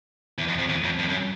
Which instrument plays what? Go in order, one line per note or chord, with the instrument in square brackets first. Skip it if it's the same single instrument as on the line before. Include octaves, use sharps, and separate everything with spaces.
[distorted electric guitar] E2
F2
F2
E2
F2
F2
F#2